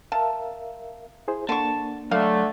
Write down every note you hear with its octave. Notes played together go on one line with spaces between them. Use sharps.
A#4 E5 F5 A5
E4 G#4 C5
D3 A#3 D4 A5 C#6
D3 F#3 A3 F5